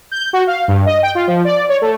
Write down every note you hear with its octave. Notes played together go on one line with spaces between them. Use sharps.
G6
F#4
F5
G2
D#5
G5
F4
F3
D5
C#5
A3